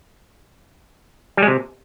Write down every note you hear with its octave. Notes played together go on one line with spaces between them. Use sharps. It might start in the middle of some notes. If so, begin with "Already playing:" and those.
G3
G#3
C3